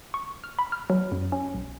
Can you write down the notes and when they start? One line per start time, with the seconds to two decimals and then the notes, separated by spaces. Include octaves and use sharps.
0.14 C#6
0.44 F6
0.59 B5
0.72 F6
0.90 F#3
1.12 F#2
1.32 C#4
1.54 B1